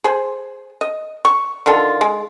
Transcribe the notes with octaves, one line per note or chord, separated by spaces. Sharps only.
G#4 C5
D#5
C#6
D3 D#3 F4 A4
G#3